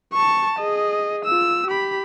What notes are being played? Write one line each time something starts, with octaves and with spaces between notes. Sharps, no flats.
A5 C#6
G#4 D#5
F4 E6
G4 B5